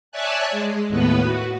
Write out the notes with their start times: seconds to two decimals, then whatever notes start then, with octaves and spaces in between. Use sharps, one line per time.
0.12 C#5 D5 E5 G#5 A5 F#6
0.51 G#3
0.89 D#2 A2 B3 B4
1.21 F#4